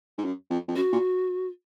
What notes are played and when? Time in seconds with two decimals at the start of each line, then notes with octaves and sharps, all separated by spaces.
0.18 G#2
0.24 F#2
0.50 F2
0.68 F2
0.75 F#2 F#4
0.92 A#2